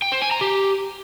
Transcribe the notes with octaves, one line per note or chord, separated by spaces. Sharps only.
G5
C5
G#5
A#5
G4